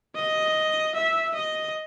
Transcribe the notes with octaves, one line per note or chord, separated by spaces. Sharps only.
D#5
E5
D#5